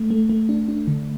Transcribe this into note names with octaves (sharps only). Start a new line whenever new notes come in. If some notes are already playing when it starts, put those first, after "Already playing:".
Already playing: A3
A3
A3
D4
D4
D3